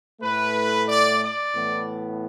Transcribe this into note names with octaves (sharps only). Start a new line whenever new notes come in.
A2 A3 B4
D5
D5
A2 E3 B3